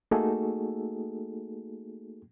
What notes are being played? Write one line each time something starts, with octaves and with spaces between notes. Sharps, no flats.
A3 A#3 D#4 F#4 G#4 A4